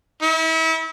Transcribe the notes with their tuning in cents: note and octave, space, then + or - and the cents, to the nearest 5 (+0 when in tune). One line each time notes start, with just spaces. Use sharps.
E4 -35